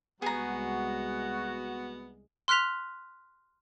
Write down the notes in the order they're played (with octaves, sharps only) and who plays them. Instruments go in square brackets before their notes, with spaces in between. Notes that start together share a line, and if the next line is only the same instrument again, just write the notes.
[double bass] C2 G#3 [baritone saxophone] B3 [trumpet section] F#4 [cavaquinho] G#4 A#5
[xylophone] C6 F6 F#6 B6 F7